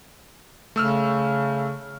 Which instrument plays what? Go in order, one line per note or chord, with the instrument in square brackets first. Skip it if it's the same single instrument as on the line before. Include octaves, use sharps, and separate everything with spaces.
[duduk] C#3 [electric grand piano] A3 E6 F6